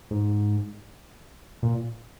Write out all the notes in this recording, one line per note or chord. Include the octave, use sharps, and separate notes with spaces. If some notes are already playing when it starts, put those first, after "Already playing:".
G#2
A#2